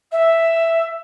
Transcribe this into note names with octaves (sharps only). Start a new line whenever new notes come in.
E5